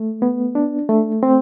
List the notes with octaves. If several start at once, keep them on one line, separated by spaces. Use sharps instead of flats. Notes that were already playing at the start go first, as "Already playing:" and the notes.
Already playing: A3
B3
D4
A3
C4